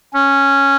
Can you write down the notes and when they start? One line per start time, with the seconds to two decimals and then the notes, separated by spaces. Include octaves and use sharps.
0.13 C#4